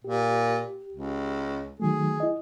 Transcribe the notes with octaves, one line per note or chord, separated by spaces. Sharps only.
A#2 G4
C#2
D#3 F#3 A3 G#4
E4 D#5